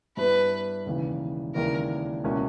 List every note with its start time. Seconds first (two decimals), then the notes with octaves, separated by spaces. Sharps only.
0.17 G2 G3 B3 E4 B4
0.86 E1 D#2 C#3 E3
1.55 E1 D#2 C#3 E3 A#4
2.24 C#2 B2 A#3 C#4 E4